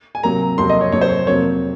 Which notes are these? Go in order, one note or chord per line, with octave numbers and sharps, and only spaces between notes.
G#5
C3 F#3 A#3 A#5
F2 C3 F#3 A#3 C6
D#5
C#5
F2 C3 F#3 A#3 C#5
C5
C#5
F2 C3 F#3 A#3 C#5